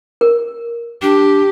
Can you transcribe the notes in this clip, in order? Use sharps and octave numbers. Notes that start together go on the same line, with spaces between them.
A#4
D4 G4